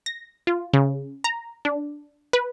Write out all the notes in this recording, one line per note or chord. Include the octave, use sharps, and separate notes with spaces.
A#6
F4
C#3
A#5
D4
B4